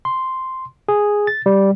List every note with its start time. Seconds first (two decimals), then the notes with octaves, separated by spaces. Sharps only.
0.05 C6
0.89 G#4
1.27 A6
1.46 G3